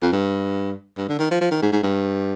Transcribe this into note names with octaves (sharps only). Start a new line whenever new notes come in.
F2
G2
G2
D3
D#3
F3
F3
D#3
G#2
G#2
G2